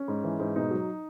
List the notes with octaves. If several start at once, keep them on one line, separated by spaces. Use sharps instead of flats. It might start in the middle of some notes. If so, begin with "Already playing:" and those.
Already playing: C#4
G#2
E3
G#2
B2 D#4
F#3